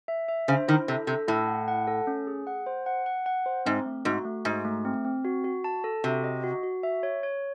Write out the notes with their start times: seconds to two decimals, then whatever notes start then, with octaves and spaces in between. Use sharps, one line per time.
0.08 E5
0.28 E5
0.48 C#3 C5
0.68 D#3 E4
0.88 C3 A4
1.07 C3 A4
1.28 A2 E4
1.47 F#5
1.68 F#5
1.87 A4
2.07 C#4
2.27 G#4
2.47 F#5
2.66 C5
2.86 F#5
3.06 F#5
3.26 F#5
3.46 C5
3.66 G#2 C4
3.86 A3
4.05 G#2 F#4
4.25 A3
4.45 G#2 F#4
4.65 A3
4.85 C4
5.05 C4
5.25 F#4
5.44 F#4
5.64 A5
5.84 A4
6.04 C3 F#4
6.24 D#5
6.44 F#4
6.63 F#4
6.83 E5
7.03 C#5
7.23 C#5